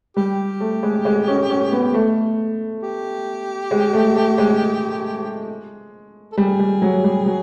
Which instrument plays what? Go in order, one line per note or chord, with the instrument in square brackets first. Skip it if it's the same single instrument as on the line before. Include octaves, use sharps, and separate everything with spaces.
[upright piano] G3 [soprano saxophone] G4
[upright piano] A3
G#3
G#3
C#4
C#4
B3
A3
[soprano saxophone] G4
[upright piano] G#3
A3
A3
G#3
[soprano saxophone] A4
[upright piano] G3 [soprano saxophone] G#4
[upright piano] G3
F#3
G3
F#3